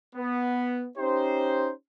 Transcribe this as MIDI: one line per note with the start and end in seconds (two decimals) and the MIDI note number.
0.16 0.85 59
0.98 1.71 61
0.98 1.71 63
0.98 1.71 67
0.98 1.71 72